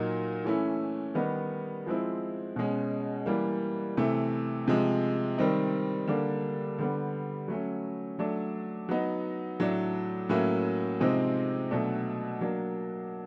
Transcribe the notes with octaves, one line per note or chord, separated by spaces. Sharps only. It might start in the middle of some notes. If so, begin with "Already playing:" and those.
Already playing: A#2 F#3 A#3 D#4
E3 A3 C#4 E4
D#3 G3 B3 D#4
F3 G#3 C4 E4
B2 G#3 C#4
E3 G3 A#3
C3 E3 A3
C3 F3 G#3
D#3 G3 C4 D#4
D3 G3 A#3 D4
D3 G3 B3
F#3 A3 C#4
F#3 A3 D4
F#3 B3 D#4
A2 F#3 A3 D4
A2 F#3 A#3 C#4 E4
C3 F3 G#3 C4 D#4
B2 F#3 A3 D4
F#3 A#3 D4